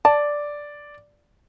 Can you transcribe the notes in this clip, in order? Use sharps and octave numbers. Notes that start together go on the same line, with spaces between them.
D5 A5